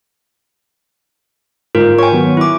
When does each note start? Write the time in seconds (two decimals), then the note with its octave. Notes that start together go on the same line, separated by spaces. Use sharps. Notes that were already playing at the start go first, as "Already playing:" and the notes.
1.75 G1 G#2 F4 A#4 G6
1.99 C#5 G5 G#5 C#6
2.12 D#3 F#3 B3
2.37 E4 D6